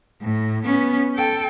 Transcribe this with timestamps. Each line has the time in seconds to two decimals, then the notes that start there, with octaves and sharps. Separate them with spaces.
0.22 A2
0.65 B3 C#4
1.16 A4 G5